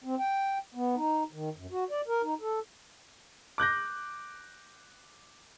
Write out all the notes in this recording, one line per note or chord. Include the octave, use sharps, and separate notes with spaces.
C4
G5
B3
D#4
D#3
F#2
F#4
D5
A#4
D#4
A4
D6 F#6 G6 A#6